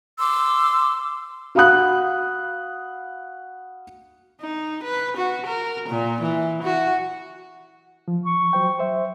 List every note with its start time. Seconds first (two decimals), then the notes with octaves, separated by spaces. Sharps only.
0.18 C6 D6 E6
1.55 F#4 F5 F#5 B5 D#6 F#6
4.41 D#4
4.83 B4
5.17 F#4
5.46 A#4
5.89 A#2
6.21 E3
6.63 F#4
8.08 F3
8.26 C#6
8.53 F#3 C5 G5
8.79 C5 E5